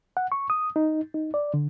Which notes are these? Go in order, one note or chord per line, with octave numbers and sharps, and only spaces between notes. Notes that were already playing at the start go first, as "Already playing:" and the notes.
F#5
C#6
D#6
D#4
D#4
D5
D3